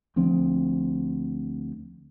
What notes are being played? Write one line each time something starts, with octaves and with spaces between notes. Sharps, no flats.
D2 F3 C4